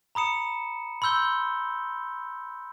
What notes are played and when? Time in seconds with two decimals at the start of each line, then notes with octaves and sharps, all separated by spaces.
0.15 A#5 B5 D#6 C#7 E7
1.02 B5 C6 E6 G6 G7